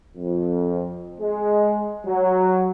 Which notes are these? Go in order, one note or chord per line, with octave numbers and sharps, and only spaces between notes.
F2
G#3
F#3